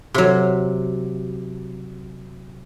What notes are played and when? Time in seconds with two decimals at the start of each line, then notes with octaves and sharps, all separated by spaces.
0.14 C3 F#3